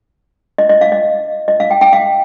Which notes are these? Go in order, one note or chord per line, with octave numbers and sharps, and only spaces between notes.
D#5
D#5
F5
D#5
D#5
F5
G5
G5
F5